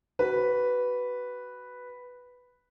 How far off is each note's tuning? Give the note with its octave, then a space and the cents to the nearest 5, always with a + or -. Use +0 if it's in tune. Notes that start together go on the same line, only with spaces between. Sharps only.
F#4 +25 B4 +0